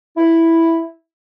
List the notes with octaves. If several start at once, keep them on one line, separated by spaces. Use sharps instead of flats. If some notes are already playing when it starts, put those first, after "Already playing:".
E4